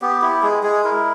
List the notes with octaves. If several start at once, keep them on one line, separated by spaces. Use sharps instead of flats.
B3 G4
E4 G4
G#3 G#4
G#3 G#4
E4 A#4